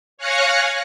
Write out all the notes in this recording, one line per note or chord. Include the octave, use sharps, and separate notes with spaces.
C#5 F5 G#5 F#6 A#6 C#7